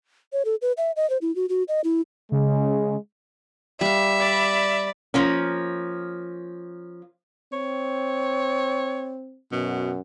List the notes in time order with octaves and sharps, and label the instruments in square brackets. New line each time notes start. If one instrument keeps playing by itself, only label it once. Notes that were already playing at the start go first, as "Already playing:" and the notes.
[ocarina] C#5
A4
B4
E5
D#5
C5
E4
F#4
F#4
D#5
E4
[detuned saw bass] C#3 [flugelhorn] G#3
[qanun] G3 F5 [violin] E5
[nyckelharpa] D5 B5
[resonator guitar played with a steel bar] F3 A#3 C#4
[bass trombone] C4 [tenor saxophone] C#5
[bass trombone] F#2 [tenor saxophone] B2